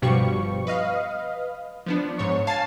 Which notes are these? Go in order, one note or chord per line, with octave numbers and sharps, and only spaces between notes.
G1 G2 B2 F3 G3 C#6
B4 D#5 F5
F3 B3 D4
G#2 C#5 C#6
F5 G#5 A5 A6 C7